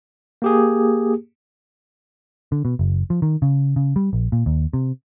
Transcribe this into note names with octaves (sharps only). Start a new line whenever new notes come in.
A#3 G4 G#4
D3
B2
F#1
F3
D#3
C#3
C#3
G3
A#1
A#2
D#2
C3